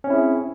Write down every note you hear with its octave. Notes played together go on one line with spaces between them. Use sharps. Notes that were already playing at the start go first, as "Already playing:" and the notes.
C4 C#4 E4 G#4 C#5